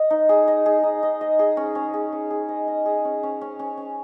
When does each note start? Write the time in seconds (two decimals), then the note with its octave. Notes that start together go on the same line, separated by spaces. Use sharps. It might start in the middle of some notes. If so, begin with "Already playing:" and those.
Already playing: D#5
0.10 D#4
0.29 G#4
0.48 D#5
0.66 G#4
0.83 D#4
1.03 D#5
1.21 D#5
1.39 G#4
1.57 C#4
1.75 C#4
1.93 G#4
2.12 C#4
2.30 G#4
2.49 D#5
2.68 D#5
2.86 G#4
3.05 C#4
3.23 C#4
3.41 C#4
3.59 C#4
3.77 C#4